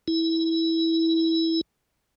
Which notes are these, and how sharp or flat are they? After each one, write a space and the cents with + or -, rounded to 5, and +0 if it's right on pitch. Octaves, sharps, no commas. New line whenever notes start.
E4 -15